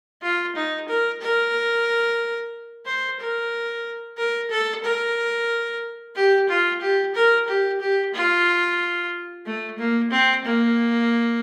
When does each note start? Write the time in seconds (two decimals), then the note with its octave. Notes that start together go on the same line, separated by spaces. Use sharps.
0.22 F4
0.56 D#4
0.89 A#4
1.21 A#4
2.86 C5
3.20 A#4
4.18 A#4
4.51 A4
4.84 A#4
6.15 G4
6.49 F4
6.81 G4
7.15 A#4
7.48 G4
7.81 G4
8.14 F4
9.46 A3
9.78 A#3
10.11 C4
10.45 A#3